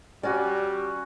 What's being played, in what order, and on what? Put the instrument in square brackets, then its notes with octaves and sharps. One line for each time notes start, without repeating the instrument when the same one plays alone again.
[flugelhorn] G3 [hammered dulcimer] C#4 F#4 [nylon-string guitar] D5